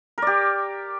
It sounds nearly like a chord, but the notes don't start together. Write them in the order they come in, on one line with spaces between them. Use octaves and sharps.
A#4 D5 G4